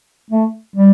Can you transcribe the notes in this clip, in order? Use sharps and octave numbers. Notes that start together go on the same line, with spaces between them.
A3
G3